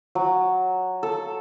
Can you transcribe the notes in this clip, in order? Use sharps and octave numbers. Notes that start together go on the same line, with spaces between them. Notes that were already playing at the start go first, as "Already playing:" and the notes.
F#3
A4